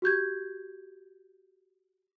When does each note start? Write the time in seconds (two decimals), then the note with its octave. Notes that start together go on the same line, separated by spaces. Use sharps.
0.02 F#4 G4 G6 G#6